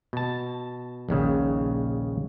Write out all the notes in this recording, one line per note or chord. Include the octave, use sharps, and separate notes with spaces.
B2 A5
A#1 D#2 C#3